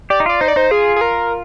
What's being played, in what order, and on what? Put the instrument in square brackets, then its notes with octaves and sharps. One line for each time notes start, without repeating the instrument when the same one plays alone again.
[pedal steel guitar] G4 [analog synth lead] D5
[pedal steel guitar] D#4
[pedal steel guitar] F4 [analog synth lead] D5
[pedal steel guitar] D#4 [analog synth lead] C5
[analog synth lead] D5
[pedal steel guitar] D#4 [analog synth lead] C5
[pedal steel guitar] F4 [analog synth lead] G#4
[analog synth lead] G#4
A#4